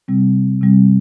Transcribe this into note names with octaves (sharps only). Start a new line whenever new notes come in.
C3 G3 C4
C3 G3 C4